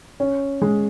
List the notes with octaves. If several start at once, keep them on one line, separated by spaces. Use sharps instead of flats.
C#4
G#3